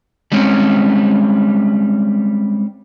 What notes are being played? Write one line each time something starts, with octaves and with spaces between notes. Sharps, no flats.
G3 G#3 C4 C#4